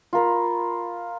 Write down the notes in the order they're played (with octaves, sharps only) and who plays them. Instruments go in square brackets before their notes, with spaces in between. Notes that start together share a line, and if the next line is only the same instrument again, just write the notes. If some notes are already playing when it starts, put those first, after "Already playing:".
[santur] F4 A#4 B5